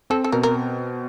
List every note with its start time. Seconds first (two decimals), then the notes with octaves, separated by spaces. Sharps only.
0.10 C4 A4
0.24 A4
0.32 B2 A#4
0.43 A#4